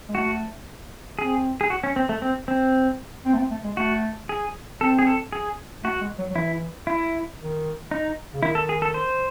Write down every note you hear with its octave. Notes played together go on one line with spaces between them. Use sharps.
G#3
A3 F#4
C4 G#4
G#4
F#4
C#4
C4
A3
C4
C4
C4
A3
C4
A3
G#3
A3 F#4
G#4
C4 A4
G#4
A4
G#4
A3 F#4
G#3
F#3
F#3
E3 E4
E4
D#3
D#4
C#3
D#3 E4
A4
G#4
A4
C5